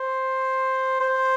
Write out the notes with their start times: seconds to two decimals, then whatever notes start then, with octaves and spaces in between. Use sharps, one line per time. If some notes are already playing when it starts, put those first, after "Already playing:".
Already playing: C5
1.00 C5